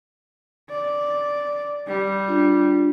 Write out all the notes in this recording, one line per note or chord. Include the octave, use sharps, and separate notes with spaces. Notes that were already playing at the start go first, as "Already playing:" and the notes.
D5
G3
D4 F4